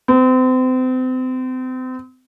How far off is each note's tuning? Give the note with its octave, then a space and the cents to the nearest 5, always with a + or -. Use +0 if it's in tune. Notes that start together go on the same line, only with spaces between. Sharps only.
C4 -35